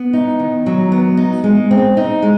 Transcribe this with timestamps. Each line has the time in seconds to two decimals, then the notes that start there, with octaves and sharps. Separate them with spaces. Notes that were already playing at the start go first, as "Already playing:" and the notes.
Already playing: B3
0.13 D#4
0.39 D#3
0.66 F#3
0.92 B3
1.17 D#4
1.44 G#3
1.71 C4
1.97 D#4
2.22 G#3